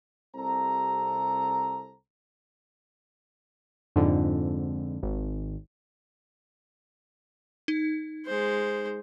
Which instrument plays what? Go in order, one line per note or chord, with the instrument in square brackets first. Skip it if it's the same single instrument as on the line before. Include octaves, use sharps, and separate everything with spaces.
[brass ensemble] C2 C3 A4 C5 A#5
[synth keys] F2 G#2 D3
G#1
[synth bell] D#4
[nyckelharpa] G#3 C5